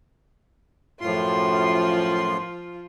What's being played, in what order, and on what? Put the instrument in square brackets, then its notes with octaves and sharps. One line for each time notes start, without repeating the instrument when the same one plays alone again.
[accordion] F#2 A2 C6 [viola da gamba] F3 F4